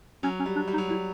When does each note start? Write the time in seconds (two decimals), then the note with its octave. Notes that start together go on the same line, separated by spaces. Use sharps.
0.23 F#3 C#4
0.39 C#4
0.46 G3
0.56 D4
0.68 G3
0.73 D#4
0.78 F#3
0.89 G3 E4